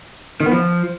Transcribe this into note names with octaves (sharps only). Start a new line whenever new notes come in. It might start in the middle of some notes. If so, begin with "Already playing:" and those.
D#3
B3
F3